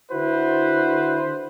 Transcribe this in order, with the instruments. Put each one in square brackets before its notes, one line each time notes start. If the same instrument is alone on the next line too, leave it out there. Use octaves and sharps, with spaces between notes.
[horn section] D3 E4 F#4 B4 C5